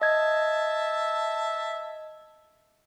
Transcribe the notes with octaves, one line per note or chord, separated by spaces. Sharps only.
D#5 E5 A5 G#6